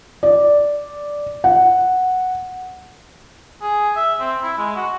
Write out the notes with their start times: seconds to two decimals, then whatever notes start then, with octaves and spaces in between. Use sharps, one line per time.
0.23 D5
1.44 F#5
3.62 G#4
3.96 E5
4.20 C4
4.43 E4
4.58 G#3
4.76 F#4